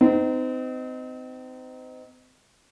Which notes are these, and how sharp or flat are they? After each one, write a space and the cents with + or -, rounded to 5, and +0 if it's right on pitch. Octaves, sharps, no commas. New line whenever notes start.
C4 -35 D#4 +0